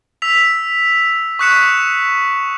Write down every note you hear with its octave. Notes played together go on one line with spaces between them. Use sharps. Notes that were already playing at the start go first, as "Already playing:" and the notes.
E6 B6 F7
C#6 D#6 F#6 B6 C#7 E7